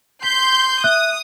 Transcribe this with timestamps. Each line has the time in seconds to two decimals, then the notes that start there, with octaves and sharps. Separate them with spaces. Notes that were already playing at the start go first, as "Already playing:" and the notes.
0.23 C6 G6 B6
0.84 E5 D#6 F#6